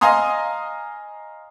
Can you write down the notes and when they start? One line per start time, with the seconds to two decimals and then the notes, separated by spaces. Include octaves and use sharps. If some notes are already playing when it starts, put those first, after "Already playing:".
0.01 D#5 F5 G#5 A#5 C6 D#6